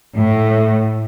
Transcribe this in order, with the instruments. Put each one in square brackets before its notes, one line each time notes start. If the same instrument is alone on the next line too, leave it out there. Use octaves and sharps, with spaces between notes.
[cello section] A2